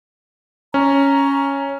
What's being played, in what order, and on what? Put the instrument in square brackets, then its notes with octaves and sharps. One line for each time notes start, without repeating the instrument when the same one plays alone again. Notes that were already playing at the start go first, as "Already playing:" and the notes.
[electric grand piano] C#4 [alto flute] A#5